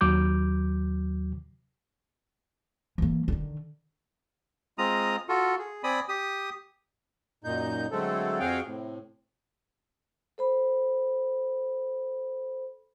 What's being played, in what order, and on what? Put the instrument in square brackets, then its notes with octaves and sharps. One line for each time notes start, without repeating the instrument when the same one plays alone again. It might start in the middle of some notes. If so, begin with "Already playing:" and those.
[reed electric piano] D#2 F#3 D6 G6
[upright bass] E3 A#3
D3 D#3
[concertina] G#3 C4 F4 A#5 D#6
F4 F#4 A4
G#4
C4 D5 G#5 B5 D#6
G4 D#6
[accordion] F#2 A#2 D#4 G6
D3 F#3 G#3 A3 C4 A4
F2 C4 F#4 G#4 F5 G5
A2 C3
[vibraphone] A4 C5 B5